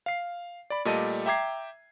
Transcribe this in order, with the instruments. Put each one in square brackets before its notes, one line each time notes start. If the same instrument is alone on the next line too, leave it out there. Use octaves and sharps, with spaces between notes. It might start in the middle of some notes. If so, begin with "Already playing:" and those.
[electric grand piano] F5 C7
D5 B5
A#2 G3 A3 D#5 A5 D#7
E5 G5 A#5 D6 G#6 C7